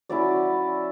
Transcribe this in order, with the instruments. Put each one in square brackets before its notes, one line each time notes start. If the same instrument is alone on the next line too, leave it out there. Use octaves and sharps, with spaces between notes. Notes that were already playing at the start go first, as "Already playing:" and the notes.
[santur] F#3 C#4 E4 D5